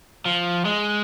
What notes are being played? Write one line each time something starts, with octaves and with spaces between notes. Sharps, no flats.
F3
G#3